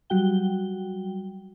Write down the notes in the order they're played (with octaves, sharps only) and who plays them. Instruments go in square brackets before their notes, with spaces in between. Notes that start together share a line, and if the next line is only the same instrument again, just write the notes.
[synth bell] F#3 G3 F#4 G5 G7